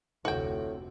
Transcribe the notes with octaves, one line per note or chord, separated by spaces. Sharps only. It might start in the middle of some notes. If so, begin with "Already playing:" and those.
F1 D2 A2 C3 F#4 G5